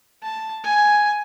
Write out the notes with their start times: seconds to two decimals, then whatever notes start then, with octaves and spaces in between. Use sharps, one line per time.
0.22 A5
0.64 G#5